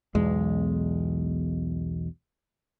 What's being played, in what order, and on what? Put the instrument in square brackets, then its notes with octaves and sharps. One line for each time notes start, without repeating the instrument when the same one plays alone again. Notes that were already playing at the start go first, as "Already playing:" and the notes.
[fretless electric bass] B1 E2 G#3